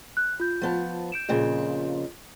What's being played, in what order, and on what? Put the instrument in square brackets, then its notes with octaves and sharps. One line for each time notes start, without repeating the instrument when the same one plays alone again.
[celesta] F#6
F4 G6
[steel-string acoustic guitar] F3 B3 A5
[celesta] G6 D7 E7
[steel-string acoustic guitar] F2 A#2 C#3